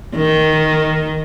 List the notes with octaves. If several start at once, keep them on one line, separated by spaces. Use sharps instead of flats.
D#3